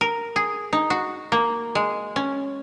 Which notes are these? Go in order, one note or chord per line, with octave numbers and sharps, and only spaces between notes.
A#4
G#4
D#4
F#4
A#3
G#3
C#4